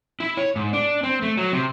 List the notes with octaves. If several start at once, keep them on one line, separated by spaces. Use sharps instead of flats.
E4
C#5
G#2
D4
C4
A3
F#3
C3